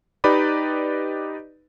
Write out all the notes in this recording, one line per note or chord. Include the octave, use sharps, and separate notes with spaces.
D#4 G4 B4 D5 D#5 B5